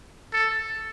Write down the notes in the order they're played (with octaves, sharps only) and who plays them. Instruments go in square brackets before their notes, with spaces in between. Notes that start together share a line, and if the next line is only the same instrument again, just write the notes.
[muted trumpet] A4